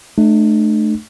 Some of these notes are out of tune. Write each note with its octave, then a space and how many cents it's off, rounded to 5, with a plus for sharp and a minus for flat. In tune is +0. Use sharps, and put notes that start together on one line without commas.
A3 -20 D4 +45